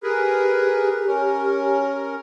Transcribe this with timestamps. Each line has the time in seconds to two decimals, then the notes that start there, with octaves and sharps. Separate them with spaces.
0.03 G4 G#4 A#4 B4
1.07 C#4 A#4